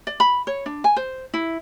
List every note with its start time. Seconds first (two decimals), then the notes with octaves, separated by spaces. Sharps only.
0.07 D5
0.20 B5
0.47 C#5
0.66 D4
0.84 G#5
0.97 C5
1.34 E4